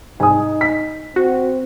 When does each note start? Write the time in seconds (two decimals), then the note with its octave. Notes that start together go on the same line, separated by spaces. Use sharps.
0.20 C2 G#2 D#4 G#5 D#6
0.61 B6
1.16 C4 F#4